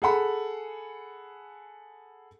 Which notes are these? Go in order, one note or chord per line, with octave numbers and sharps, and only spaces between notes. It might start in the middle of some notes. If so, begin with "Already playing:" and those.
G#4 A4 F#5 B5